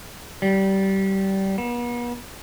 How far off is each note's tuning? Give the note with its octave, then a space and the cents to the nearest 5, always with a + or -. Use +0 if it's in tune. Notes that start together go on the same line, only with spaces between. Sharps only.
G3 -20
B3 -40